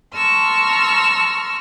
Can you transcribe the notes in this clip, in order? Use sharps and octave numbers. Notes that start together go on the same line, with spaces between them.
A5 A#5 C6 C#6 E6 F6